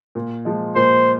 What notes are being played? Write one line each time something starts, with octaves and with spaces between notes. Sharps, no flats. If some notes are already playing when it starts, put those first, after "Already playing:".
A#2
F3 G#3
A#2 C5